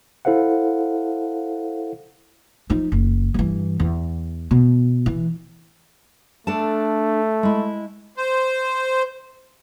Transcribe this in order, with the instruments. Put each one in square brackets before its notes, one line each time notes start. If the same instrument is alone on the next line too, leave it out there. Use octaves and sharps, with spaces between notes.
[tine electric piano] E4 A4 C5 F5 F#5
[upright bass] F3 D#4
F#1
G2 E3
E2
B2
E3
[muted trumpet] A3 [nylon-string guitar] D4 A4 A5
[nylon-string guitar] G#3 E4
[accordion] C5